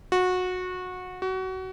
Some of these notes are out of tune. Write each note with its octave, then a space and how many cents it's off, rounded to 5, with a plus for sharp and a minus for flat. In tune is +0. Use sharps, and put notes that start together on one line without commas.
F#4 -20
F#4 +25